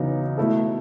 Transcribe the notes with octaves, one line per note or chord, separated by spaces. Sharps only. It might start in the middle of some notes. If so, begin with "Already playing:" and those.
Already playing: E2 C#3 F#3 B3 D#4
B2 A3 E4 A4